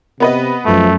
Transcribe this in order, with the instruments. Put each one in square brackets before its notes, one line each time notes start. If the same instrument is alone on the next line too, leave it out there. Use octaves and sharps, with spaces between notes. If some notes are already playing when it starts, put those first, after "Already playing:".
[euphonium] C3 [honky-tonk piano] B3 B4 D#5
[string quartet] F#2 [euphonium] F3 [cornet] A3